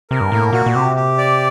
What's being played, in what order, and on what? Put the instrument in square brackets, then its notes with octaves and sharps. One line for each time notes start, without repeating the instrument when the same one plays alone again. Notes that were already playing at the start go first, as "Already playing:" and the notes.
[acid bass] C3 [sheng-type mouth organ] A#4
[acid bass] G2
[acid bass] A2 [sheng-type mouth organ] A#3
[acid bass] A#2 [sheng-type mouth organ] F#4
[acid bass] A#2
[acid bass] C3 [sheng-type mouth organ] G4
[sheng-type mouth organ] G4
D5